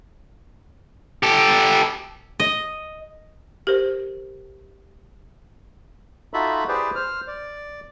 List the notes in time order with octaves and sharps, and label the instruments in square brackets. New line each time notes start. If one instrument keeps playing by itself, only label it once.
[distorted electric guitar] G4 A4
[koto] D#5
[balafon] G4 A#4 C5
[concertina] D#4 F4 F#4 A4 E5 B5
E4 G4 G#4 B4 C5 D5
C5 F6
D5